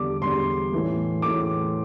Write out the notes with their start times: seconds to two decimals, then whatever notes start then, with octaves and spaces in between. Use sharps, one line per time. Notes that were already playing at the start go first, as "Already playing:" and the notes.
Already playing: E2 D3 G3 D4 D6
0.22 E2 D3 G3 D4 C6
0.72 A2 E3 A3
1.22 A2 E3 A3 D6